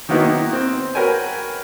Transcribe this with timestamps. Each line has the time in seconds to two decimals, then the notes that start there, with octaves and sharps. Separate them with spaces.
0.09 D#3 F#3 A#3 B3 D#4 E4
0.53 C4
0.95 F#4 A#4 B4 C#5 G5 G#5